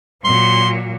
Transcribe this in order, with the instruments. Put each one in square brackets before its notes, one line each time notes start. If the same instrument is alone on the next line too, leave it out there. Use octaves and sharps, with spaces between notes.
[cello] A#2 F#3 [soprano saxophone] C6